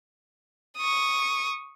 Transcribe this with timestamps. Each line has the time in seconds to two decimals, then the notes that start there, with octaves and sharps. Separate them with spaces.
0.77 C#6 D#6